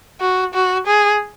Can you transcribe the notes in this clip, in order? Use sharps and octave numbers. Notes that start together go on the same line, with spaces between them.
F#4
F#4
G#4